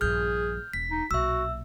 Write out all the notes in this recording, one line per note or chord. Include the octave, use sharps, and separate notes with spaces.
A#1 G2 G#4 F6 G6
E1 B6
D#4
B1 A#2 F#4 E5 E6